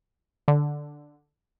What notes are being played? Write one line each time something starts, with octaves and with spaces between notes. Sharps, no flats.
D3